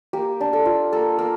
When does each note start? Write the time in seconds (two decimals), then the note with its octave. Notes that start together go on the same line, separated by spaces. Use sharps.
0.13 A#3 G4
0.41 D4
0.53 A4
0.66 F4
0.92 A#3 A4
1.19 A#3